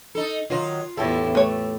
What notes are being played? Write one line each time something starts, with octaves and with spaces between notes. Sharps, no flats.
D#4 A4
D#3 F#3 F4
E2 A2 E4 G4 A4
A3 B4 C#5